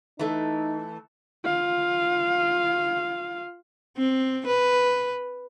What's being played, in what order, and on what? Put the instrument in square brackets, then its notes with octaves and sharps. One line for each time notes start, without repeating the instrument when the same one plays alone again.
[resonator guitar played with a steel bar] E3 A3 [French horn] D#4
[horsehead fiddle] F4 F5
[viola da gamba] C4
B4